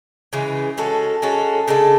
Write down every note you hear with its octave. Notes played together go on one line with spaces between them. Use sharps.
C#3 E3 G#3
G#3 C#4 F#4 A4
G#3 C#4 F#4 A4
C#3 G#3 D4 A4